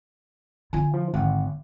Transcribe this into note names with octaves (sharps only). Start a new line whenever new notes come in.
D3 F4 G#5
F3
G#1 D3 F#5